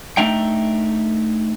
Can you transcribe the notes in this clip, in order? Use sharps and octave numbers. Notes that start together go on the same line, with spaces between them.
A3 D4 D#4 E5 G5